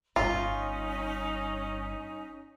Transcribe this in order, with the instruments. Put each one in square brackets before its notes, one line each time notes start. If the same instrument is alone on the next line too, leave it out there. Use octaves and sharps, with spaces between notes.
[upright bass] G1 G2 [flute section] C#4 D#4 [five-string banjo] F4